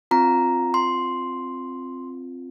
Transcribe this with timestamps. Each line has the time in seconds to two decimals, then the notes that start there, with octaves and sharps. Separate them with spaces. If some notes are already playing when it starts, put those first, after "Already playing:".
0.11 C4 F4 A#5
0.74 C6